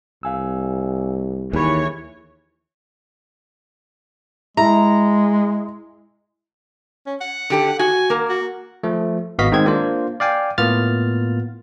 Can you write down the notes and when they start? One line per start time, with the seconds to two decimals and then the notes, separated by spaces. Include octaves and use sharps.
0.23 C2 F5 G#5 E6
1.53 D#2 E3 G#4 C#5 B5
4.57 G#3 E4 A#5
7.06 C#4
7.21 F#5
7.50 D3 G4 A4
7.79 F#4 G#5
8.10 A#3 A#4
8.29 F#4
8.83 F3 A3
9.39 G#1 B3 F#4 D#5 F5 B6
9.52 D#3 G#3 C4 G#6
9.66 A#3 D4 F4 C5
10.20 D5 F5 G5 G#5
10.58 A2 A#3 B3 F4 F6 A6